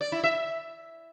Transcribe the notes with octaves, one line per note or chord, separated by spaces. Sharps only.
D5
E4
E5